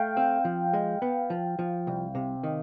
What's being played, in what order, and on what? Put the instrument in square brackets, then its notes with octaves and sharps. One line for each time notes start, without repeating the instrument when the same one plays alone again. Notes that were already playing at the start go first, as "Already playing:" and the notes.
Already playing: [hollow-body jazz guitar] A3 [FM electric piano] F5 G5
[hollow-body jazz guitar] C4
F3
G#3
B3
F3
F3
C2
C3
D#3